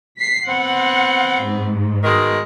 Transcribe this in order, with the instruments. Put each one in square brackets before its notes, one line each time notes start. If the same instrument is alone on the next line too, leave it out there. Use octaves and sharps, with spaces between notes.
[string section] B6 C7
[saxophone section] B3 C4 [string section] F#5
[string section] G#2
[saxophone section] B2 D#3 G#3